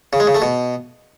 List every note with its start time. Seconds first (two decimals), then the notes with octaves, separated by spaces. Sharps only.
0.13 C#3
0.20 G#3
0.27 C#3
0.35 A3
0.42 B2